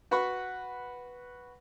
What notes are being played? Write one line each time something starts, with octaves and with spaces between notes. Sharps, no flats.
F#4 B4 F#5 B5 C#6